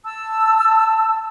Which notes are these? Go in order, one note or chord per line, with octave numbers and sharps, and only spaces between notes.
A5 E6